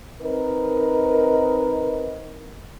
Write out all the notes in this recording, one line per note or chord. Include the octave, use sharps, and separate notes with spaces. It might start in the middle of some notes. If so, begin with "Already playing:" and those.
C4 D#4 A#4 B4